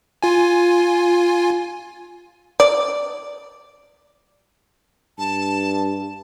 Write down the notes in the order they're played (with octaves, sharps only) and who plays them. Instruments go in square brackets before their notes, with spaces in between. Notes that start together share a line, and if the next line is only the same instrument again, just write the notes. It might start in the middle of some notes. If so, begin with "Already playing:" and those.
[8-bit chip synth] F4 G#5
[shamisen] D5
[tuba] G2 [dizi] A5